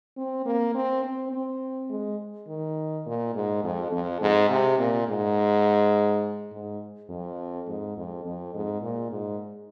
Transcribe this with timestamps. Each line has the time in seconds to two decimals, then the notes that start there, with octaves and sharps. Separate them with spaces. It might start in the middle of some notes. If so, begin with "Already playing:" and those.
0.17 C4
0.46 A#3
0.75 C4
1.04 C4
1.32 C4
1.90 G#3
2.48 D#3
3.06 A#2
3.35 G#2
3.64 F2
3.92 F2
4.22 G#2
4.49 C3
4.79 A#2
5.08 G#2
6.52 G#2
7.09 F2
7.68 G#2
7.97 F2
8.25 F2
8.55 G#2
8.82 A#2
9.11 G#2